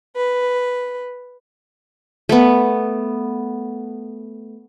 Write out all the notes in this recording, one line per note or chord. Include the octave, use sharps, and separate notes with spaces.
B4
A3 B3